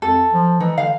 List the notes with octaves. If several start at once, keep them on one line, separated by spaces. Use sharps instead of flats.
F2 A4
F3
E3 D#4
D3 F5